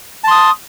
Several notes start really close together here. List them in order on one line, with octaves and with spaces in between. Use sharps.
A5 C6 D#6